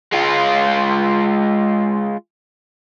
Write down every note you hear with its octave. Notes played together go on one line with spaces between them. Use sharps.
G#3 F4